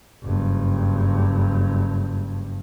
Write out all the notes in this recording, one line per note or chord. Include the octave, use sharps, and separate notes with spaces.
F#1 G2